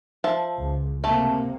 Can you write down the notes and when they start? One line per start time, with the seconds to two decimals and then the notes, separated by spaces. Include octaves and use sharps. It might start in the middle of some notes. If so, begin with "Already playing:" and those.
0.24 F3 E5 A5
0.58 C#2
1.04 C3 A3 A#3 A5